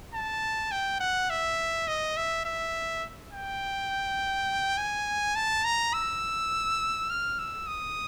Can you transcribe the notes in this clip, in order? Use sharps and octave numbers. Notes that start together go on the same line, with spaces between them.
A5
G5
F#5
E5
D#5
E5
E5
G5
G#5
A5
A#5
E6
F6
E6
D#6